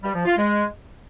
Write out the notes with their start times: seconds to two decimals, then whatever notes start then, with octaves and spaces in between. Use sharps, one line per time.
0.02 G3
0.14 F3
0.25 F4
0.37 G#3